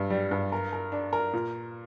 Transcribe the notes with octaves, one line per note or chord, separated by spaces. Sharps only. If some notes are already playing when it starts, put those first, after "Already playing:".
Already playing: G2 G3
G3
G2
A#4
A#4
D4
A#4
A#2